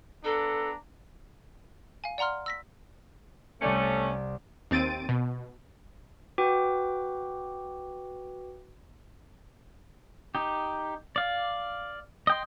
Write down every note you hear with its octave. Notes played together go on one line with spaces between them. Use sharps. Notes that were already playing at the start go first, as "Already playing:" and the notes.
B3 D4 A4 A#5
F5 G#5
D5 F#5 A#5 C6 F6
E6 A#6 B6
C2 A3 C#4 D5 C#7
D#2 C4 A6 D7 D#7
B2
F#4 B4 G5 D6
D#4 G4
D5 F5
D#5 G5 C6